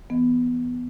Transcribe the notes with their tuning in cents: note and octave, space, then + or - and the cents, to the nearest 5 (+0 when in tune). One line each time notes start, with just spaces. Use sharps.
E3 +0 B3 +0 D#5 +0